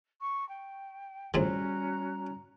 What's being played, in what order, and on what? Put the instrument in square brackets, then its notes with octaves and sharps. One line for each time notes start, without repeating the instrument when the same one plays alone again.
[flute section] C#6
G5
[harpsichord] F2 A2 C#3 [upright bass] G3 B3 [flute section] C#4 F#4 A#5